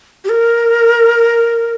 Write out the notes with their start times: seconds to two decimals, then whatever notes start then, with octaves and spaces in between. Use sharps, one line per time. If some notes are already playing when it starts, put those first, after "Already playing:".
0.24 G4
0.29 A#4